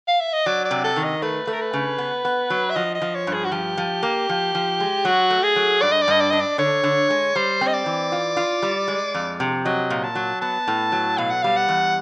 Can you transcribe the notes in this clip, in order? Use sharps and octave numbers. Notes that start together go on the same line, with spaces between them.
F5
E5
D#5
F#3 D5
D5
C3
A4
D#3
D#5
A3 B4
A3
A#4
B4
C#3
B3
B3
F#3
E5
F3 D#5
D#5
F3
C#5
G2
G#4
F#4
F3 G4
F3
A#3
F3
F3
G#3
F#3 F#4
A3
G#4
F#3
G2 D5
D#5
D5
G2 D#5
D5
D4 D#5
D5
D3 C#5
D3
G#3
G3 C5
C4
D#5
D5
E3
F4
F4
G3
G#3
F2
C3
F#3 D#5
A#2
A5
F#3
B3 A5
A2
F#3
B2 F5
F#5
G3 F5
F#5
E2